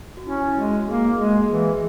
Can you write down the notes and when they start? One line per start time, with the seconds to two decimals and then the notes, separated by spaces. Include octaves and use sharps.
0.17 F#4
0.26 C#4 E4
0.47 E4
0.57 G#3 F#4
0.88 A#3 G#4
1.18 G#3 G#4
1.49 E3 G#4